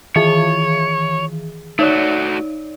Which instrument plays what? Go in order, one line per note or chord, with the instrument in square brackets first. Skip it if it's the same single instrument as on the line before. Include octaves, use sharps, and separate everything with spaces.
[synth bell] D#3 E3 G#4 [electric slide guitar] C#5
[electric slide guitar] A3 F#4 [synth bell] D#4 C#5 D5